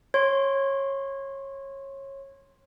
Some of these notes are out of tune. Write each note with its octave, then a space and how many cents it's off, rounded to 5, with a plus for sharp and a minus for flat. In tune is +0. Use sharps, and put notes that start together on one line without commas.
C#5 -20 C6 +0